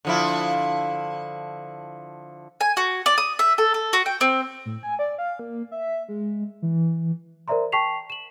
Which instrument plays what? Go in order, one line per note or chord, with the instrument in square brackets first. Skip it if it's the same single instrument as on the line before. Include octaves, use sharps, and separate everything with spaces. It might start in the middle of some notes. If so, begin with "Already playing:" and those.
[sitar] D3 F3 E4
[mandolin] G#5
F#4
D5
D#6
E5
A4
A4
F#4
G5
C4
[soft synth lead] A2
G#5
D5
F5
A#3
E5
G#3
E3
[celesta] A#4 C5 D5 E5 A#5 C6
G5 A5 C#6 B6 C7 F7
E7 F#7